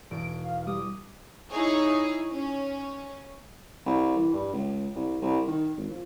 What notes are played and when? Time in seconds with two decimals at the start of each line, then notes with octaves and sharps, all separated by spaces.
0.11 E1 D7
0.44 F5
0.67 G3 D6 D#6
1.51 D#4 E4 G#4 C#5
2.32 C#4
3.86 C2
4.17 E3
4.33 G2
4.53 C#2
4.95 C2
5.22 C2
5.47 D#3
5.77 G#1
5.90 F3